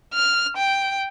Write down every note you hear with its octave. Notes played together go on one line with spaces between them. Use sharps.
F6
G5